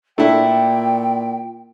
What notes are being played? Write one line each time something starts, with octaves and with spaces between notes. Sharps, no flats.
A#2 A3 D4 E4 G5